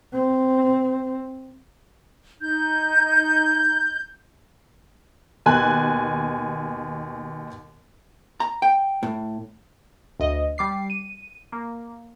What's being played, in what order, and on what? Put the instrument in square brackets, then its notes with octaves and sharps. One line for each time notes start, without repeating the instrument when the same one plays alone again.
[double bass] C4
[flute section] D#4 G6
[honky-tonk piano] D#2 B2 G#5 F#6
[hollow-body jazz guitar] A#5
G5
A2
[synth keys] D2 D#5
G3 D6 C7
D#7
A#3